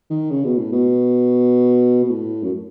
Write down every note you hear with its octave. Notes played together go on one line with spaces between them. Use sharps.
D#3
C#3
B2
A2
B2
B2
A2
F#2